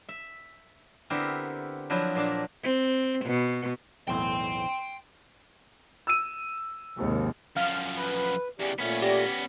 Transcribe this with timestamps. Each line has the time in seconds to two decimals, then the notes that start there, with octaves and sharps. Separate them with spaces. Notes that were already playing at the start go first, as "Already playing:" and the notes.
0.09 E5
1.10 D3 B3 C4 E4 G4 A#4
1.90 F3 F#3 D4 E4 F4
2.15 A#2 A#3 D4 A5 A#5
2.64 C4
3.26 B2
4.08 B1 E2 A2 G5 C6
6.07 E6 D#7
6.98 D#2 G#2 C3
7.57 F#2 F3 F5 F6
7.96 B4
8.60 E2 C#3 G4 D5
8.79 A#2 A3 B3 C#4
9.02 G4 D5 A#6